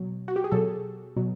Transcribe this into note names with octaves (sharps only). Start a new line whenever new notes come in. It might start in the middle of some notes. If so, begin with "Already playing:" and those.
Already playing: B2 F#3
F#4
G4
G#4
B2 F#3 A4
B2 F#3